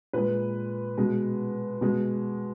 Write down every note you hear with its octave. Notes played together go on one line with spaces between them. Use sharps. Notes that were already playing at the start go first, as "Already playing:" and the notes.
A#2 G#3 B4
B2 G#3
B2 G#3